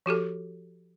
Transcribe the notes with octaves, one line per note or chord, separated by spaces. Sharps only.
F3 F#4 G4 A4